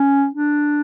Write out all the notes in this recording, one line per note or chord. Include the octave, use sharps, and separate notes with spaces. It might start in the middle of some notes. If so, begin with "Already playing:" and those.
Already playing: C#4
D4